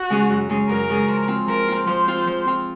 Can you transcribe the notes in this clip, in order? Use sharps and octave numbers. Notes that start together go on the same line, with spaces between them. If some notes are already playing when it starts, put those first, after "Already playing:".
Already playing: F#4
C#3 G#3 C#4 G#4
F#2
C#3 G#3 C#4 G#4
F#2 A#4
C#3 G#3 C#4 G#4
F3
C4 F4
F3 A#4
C4 F4
F3 C5
C4 F4
F3
C4 F4